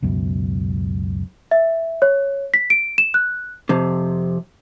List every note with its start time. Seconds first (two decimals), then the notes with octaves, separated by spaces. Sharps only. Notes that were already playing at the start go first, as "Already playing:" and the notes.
0.03 C#2 F#2 B2
1.51 E5
2.02 C#5
2.54 B6
2.70 D7
2.98 E7
3.14 F#6
3.69 F2 C3